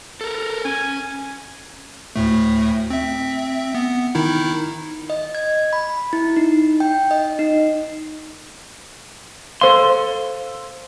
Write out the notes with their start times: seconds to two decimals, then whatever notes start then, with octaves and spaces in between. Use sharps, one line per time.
0.21 A4 A#4
0.65 C#4 G#5
2.16 D2 A2 A3
2.90 C4 E5
3.75 B3
4.15 D#3 D#4 E4
5.10 D#5
5.35 G#6
5.73 B5
6.13 E4
6.36 D#4
6.80 G5
7.11 D#5
7.39 D#4
9.61 A4 C5 F5 C6